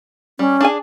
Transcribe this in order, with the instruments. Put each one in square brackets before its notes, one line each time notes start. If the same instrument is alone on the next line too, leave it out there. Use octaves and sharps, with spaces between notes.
[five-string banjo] G3 [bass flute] C#4
[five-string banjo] D4 G#4 G#5